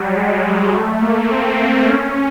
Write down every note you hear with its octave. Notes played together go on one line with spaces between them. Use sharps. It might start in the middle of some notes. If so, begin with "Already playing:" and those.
Already playing: F#3 G3
G#3
A3
A#3
C4
C#4